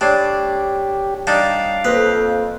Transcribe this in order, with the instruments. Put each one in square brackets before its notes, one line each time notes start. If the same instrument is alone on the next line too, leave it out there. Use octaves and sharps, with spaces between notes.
[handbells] A3 C#5 C7 [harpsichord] D4 [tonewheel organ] G4
[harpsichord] G3 D4 D#4 [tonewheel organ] F5
[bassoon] F2 [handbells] A#3 A4 C5 [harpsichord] B4